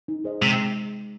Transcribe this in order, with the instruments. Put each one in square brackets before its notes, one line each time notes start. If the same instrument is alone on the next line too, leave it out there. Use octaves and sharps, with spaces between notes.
[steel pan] D#4
G#4 C5 D#5
[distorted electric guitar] C3 [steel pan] G#3